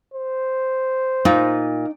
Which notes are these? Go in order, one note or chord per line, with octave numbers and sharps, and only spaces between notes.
C5
A#2 D#4